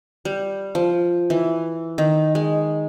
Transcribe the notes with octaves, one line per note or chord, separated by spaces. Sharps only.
G3
F3
E3
D#3
G#3